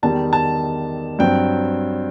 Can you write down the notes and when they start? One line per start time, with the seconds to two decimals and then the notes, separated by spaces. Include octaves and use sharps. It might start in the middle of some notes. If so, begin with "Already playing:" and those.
0.02 E2 D#3 G3 D#4 A5
0.33 A5
1.19 G2 F#3 C4 G5